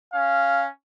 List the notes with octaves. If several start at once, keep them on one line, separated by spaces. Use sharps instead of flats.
C#4 F5